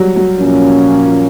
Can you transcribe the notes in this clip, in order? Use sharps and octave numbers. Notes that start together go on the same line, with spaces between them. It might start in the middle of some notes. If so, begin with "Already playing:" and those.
Already playing: F#3 G3
F#3
A#2 F3 A#3 C#4